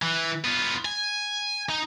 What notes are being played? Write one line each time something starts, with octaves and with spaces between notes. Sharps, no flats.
E3
B3 F4
G#5
D#4